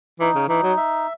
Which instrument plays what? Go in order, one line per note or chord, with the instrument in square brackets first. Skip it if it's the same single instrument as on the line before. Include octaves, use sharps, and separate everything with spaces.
[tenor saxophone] E3 [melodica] D#4
[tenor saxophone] C#3
[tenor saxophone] E3 [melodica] D#4
[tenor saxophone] F#3
[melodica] E5